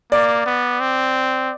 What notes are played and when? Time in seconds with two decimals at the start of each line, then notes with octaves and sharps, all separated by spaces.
0.12 A#3 D5
0.46 B3
0.80 C4